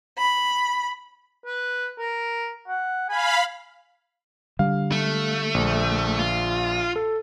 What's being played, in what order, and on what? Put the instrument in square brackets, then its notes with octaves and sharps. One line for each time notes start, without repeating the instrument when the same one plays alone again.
[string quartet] B5
[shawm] B4
A#4
F#5
[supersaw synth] F5 B5 [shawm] G#5
[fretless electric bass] D3 G3 [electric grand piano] F5
[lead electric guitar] A3
[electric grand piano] A#1
[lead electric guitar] F4
[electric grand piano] A4